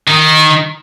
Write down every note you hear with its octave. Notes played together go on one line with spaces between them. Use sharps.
D#3